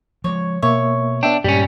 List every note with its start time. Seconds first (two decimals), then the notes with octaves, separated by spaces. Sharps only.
0.24 F3 G3 G#3 C#5
0.63 B2 A#3 C#5 E5
1.23 B3 D4 E5 G5
1.44 G2 A#2 G3 G#3 C#4 G4